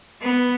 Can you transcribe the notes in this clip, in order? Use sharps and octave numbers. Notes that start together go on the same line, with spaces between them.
B3